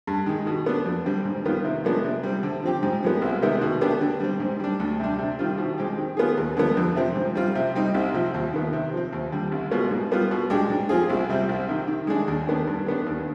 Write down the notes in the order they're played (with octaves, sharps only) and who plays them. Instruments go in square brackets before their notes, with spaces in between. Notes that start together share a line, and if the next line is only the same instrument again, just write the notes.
[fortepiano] G2
D#3 G#3
B2
B3 D4
F2
D3 G3 C4
G#2
D#3 G3 B3 F4
C3
F3 G#3 B3 D4
C3
G3 C4
D3
F3 C4 G4
G#2
F3 G#3 B3
C2
C3 D#3 G#3 B3
B2
B3 D4 G4
D3
G3 C4
G#2
G3 D4
D2
C3 G3 D4
C3
D#3 G3 C4 F4
B2
G#3 C4 G4
D#3
B3 F4 G#4
D#2
D3 F3 G#3 B3
F2
C3 F3 C4
G#2
G3 C4 F4
C3
G3 C4 D#4
C2
C3 F3 C4
D#2
D#3 B3
C3
F3 C4
D#2
D3 G3
C2
B2 G#3 B3 F4
G#2
G3 B3 F4
B2
G#3 D4 G4
G#2
F3 C4 F4 G#4
C2
C3 G3 C4
C2
C3 D#3
D#3
G#3 D4 G#4
D#2
D#3 B3 D4
G2
D#3 B3 D4
D#2